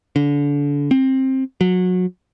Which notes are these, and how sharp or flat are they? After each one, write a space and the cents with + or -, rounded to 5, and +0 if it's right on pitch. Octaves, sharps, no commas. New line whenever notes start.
D3 -30
C4 +15
F#3 -25